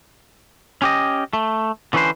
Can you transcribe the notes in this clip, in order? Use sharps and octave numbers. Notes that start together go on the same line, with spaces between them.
C#4 G4 D#5
A3
D3 E3 C#4 G#4 B4 C5